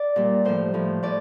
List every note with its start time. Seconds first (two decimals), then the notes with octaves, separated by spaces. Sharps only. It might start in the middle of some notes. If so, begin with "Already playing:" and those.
Already playing: D5
0.16 A#2 G3
0.45 A2 F3 C5
0.74 A2 F3
1.03 A2 D5